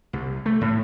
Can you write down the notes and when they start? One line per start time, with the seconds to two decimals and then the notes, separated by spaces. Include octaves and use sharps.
0.13 C2
0.46 A3
0.61 A2